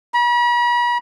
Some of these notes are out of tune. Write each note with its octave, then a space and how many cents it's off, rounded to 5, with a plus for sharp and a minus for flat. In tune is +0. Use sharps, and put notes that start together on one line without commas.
B5 -45